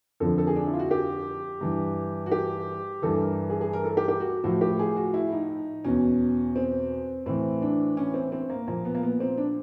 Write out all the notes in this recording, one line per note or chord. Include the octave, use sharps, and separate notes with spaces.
F2 D3 F3 A4
A4
G#4
D4
E4
F4
F#4
G4
G2 E3
F#4
G4
G2 E3 A4
A#4
G#4
G#4
A#4
A4
G4
G4
F#4
A2 F3 F#4
G4
G#4
F#4
E4
D#4
E2 B2 C#4
C4
A2 E3 C4
D4
C#4
C4
C4
A#3
A#2 F3 A#3
B3
A#3
B3
C4
D4